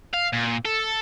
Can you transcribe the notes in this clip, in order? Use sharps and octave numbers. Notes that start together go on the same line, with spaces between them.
F5
A#2
A4